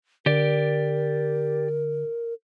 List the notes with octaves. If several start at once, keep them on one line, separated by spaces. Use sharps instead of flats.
D3 G4 A#4 D5